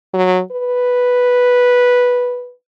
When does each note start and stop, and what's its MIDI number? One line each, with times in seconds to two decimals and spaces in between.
0.14 0.40 54
0.52 2.52 71